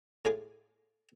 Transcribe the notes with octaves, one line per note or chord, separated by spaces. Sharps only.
A2 F4 G#4 G#5 D6